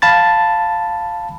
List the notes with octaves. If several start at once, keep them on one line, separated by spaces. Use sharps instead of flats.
F5 A5 B5 A6